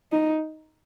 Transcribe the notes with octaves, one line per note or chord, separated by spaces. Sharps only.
D#4